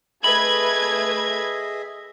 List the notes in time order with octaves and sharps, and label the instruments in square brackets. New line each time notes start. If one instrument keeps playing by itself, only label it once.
[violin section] A3 B4 G#6 [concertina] G#4 D#5 E5 [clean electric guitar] B5